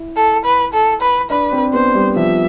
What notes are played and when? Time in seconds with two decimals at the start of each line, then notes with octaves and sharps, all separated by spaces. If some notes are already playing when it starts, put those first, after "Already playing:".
Already playing: E4
0.17 A4
0.45 B4
0.73 A4
1.01 B4
1.30 D4 B4
1.52 C4
1.73 B3 C5
1.94 G3
2.15 F3 E5